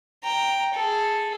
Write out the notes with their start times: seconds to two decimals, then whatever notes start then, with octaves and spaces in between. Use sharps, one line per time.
0.23 G5 A#5
0.74 G#4 A4